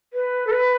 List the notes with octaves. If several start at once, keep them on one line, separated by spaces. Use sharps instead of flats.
B4
A4
B4